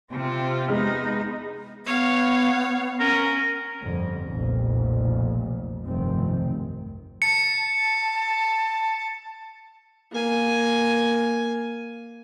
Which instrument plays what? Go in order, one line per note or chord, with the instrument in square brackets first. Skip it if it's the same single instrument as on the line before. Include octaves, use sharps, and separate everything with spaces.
[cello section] C3 [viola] C4 F4
[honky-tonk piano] G#3 F6 [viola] B3 D#4
[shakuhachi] B3 [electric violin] C#5 F5
[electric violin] C#4 [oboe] A#4
[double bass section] G1 F2 D3
F1 B1 F2 A#2
F1 B1 G2 D#3 C4
[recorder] A5 [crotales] C#7
[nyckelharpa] A#3 G#5